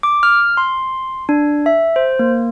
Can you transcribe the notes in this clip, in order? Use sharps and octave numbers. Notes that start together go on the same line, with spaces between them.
D6
F6
C6
D4
E5
C5
A#3